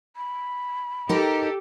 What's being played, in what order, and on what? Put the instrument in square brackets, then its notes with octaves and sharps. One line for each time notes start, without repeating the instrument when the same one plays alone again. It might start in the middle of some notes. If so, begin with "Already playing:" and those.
[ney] B5
[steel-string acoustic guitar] D#4 A#4 [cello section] G4 A4